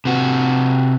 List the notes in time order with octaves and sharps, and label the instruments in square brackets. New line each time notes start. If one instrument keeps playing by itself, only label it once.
[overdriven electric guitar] C3 F#4